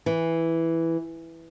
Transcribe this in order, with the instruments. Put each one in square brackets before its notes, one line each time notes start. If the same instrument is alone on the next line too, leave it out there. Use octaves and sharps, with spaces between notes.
[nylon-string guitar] E3